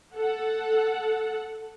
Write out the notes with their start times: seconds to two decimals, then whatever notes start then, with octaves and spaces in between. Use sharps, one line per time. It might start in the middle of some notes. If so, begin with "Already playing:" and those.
0.15 A4 F#5